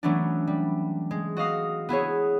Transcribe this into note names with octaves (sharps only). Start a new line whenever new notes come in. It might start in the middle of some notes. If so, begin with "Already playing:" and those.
E3 F#3 A3 B3 C#4 D4
G3
G#3
F#4 D#5 F5 D#6
B3 E4 G#4 C#5